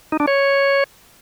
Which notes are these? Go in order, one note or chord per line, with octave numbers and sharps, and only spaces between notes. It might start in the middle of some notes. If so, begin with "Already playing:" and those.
D#4
D4
C#5